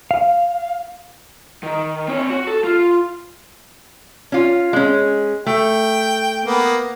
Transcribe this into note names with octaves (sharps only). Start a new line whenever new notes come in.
F5
D#3
C4 C#5
F#4
A4
F4
C#4 F4
G#3 C#4
A3 G5
A#3 B3